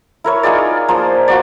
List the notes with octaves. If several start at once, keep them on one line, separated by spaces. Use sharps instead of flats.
E4 A#4 C#5
D#4 F4 G#4 D5
F3 A#3 C5
F4 F#4 D5